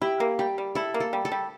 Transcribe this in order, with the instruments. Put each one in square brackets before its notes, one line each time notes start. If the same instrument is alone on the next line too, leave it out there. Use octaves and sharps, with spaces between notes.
[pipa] E4 [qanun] G4
[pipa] A#3
[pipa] G3 [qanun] G4
[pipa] G3
[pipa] E4 [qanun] A4
[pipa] A#3
[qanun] A4
[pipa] G3
[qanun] A4
[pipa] G3